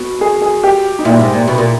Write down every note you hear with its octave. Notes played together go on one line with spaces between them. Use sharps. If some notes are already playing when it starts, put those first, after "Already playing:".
Already playing: B2
G#4
G#4
G4
D#4
A#2 E4
G#2
A#2
B2
A#2